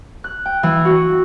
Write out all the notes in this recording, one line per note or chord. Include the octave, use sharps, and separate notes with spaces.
F#6
G5
E3
F#4